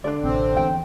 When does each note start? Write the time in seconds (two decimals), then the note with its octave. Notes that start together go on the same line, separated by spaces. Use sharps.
0.04 D3 D4 D5
0.24 A1 C3 C4
0.57 E2 G5